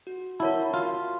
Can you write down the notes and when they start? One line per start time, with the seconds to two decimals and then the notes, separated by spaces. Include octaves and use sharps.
0.07 F#4
0.40 E4 A#4 C#5 F#5 A5
0.74 F4 F#4